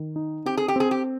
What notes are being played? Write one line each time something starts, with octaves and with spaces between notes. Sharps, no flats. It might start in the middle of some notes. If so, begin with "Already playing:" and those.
Already playing: D#3
D#4
C4 G4
G#4
G4
C4 G#4
G4